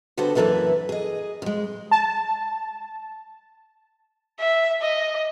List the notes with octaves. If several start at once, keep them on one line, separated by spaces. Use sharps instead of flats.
D3 B3 F#4 G4 A4 C5
F#2 E3 A#3 A4 B4 E5
G#4 D#5
F2 G#3
A5
E5
D#5